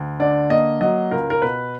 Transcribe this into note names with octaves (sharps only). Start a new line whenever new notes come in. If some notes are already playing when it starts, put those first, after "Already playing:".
Already playing: D2
D3 D5
A#3 D#5
F#3 D#5
C#2 A#4
A#4
B2 B4